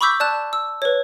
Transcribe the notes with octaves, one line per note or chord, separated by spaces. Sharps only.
B5 C#6 D6 E6 G6 B6
D5 A5 F#6 E7
E6
B4 C#5